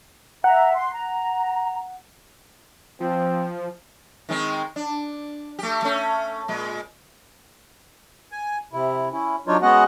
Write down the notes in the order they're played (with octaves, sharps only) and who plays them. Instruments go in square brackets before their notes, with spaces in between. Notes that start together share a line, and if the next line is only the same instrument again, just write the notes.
[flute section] E5 A#5 [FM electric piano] F#5
[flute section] C6
A#5
[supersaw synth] F3 [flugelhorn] C4
[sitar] D#3 G#3 C4
D4
A3 G4
A3 C#4
A#2 G#3
[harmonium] G#5
C3 E4
C#4 E4
F#3 D4 D#4 F4 C#5
G#3 B3 C#4 F#4 D#5 F#5